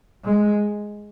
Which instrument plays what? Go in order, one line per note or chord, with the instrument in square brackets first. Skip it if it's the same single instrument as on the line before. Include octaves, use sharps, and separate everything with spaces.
[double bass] G#3